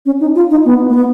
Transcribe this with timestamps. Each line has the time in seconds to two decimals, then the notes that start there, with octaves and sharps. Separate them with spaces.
0.06 C#4
0.20 D#4
0.35 F4
0.51 D#4
0.65 B3
0.89 A#3
0.93 B3